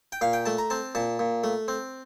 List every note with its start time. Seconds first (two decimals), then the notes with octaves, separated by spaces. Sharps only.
0.12 G5
0.21 A#2 F5
0.33 G5
0.46 A3 A5
0.58 A#5
0.70 C4 A5
0.95 A#2 A5
1.19 A#2
1.44 A3
1.68 C4